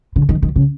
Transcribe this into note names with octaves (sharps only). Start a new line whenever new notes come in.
D3
D#3
D#3
C#3